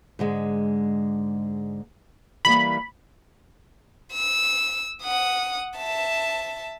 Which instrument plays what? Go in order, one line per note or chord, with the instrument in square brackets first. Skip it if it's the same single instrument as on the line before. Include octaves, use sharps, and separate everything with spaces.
[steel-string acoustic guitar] G#2 D3 G#3
[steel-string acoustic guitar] E3 G3 A#3 [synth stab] B5
[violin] E6
F#5 D#6
E5 A5